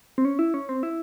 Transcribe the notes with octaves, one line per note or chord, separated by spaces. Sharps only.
C4
C#4
E4
C#4
C4
E4